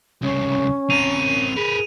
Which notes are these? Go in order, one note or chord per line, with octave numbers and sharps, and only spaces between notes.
C2 C#3 C#4
C4 A#4 D#7 F7
G#4 A#4 B4